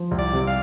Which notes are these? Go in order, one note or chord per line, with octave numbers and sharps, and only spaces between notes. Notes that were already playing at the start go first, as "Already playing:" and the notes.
Already playing: F3
C2
D5
C3
F5